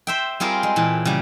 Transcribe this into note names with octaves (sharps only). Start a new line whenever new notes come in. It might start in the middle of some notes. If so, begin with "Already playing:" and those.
C5 E5 G5
G3 C4 F4 G#4 A#4
G#3
A#2 E3 A5
C#3 G3